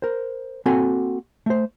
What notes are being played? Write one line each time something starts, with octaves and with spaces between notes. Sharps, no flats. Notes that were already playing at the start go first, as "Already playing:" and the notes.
A#4 C5
A#3 C4 F#4 A4 F#5 G#5
A3 C5